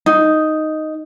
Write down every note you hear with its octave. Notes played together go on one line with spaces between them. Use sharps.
D#4